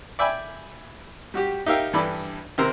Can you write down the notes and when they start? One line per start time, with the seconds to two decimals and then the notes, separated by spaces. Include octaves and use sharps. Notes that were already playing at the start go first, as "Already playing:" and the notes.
0.19 D5 E5 G5 G#5 B5
1.34 G3 F#4 G4
1.66 D#4 G4 A#4 E5 F5 G5
1.93 G2 E3 D4 A4 B5 D6
2.58 G#1 C3 C4 A#4 C5 E6